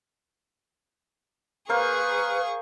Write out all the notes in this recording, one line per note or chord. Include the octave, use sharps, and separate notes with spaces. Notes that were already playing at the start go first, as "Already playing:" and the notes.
A#3 G#4 B4 C5 F5 C#6